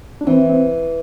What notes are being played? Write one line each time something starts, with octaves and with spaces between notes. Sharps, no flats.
D4
E3 C4
C4